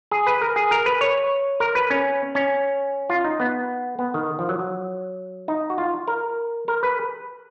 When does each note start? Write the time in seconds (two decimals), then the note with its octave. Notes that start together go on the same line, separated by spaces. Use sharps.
0.11 G#4
0.27 B4
0.41 A#4
0.56 G#4
0.71 A#4
0.86 B4
1.01 C#5
1.60 A#4
1.75 B4
1.90 C#4
2.35 C#4
3.10 F4
3.25 D#4
3.40 B3
3.99 B3
4.14 D#3
4.39 F3
4.49 F#3
4.59 F#3
5.48 D#4
5.70 F#4
5.78 F4
6.08 A#4
6.68 A#4
6.83 B4